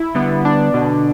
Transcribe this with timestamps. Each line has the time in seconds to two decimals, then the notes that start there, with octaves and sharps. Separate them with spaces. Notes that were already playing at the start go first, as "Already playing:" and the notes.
Already playing: E4
0.15 D3 G3 B3
0.45 D4
0.74 B2 D3